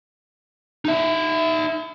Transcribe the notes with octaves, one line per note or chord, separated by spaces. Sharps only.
D#4 E5